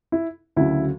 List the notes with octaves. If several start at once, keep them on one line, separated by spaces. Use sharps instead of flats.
E4
D2 C#3 F#3 E4